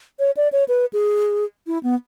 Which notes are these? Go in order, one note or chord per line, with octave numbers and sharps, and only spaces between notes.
C#5
D5
C#5
B4
G#4
E4
B3